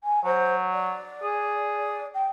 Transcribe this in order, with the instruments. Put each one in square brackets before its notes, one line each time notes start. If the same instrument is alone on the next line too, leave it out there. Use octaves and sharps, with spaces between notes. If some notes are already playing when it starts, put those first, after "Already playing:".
[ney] G#5
[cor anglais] F#3 [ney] C5
[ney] D5
[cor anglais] G#4
[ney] G5